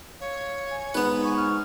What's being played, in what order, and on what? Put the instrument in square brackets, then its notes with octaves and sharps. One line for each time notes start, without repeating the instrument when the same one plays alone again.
[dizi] C#5 [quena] F5
[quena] G#5
[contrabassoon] G#2 [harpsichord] B3 B4
[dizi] G#5 [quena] C#6
[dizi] F6